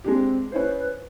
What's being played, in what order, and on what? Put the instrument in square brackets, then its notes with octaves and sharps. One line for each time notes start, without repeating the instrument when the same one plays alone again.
[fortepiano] G#3 D4 G4 [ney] C4
[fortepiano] C#4 E4 C5 [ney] B4